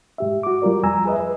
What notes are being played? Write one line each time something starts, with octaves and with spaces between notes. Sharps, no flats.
G#2 G4 E5
F#4 D6
G3 F4 A#4 D5
F2 G#5 A#5 E6
G#4 B4 D#5 E5
B4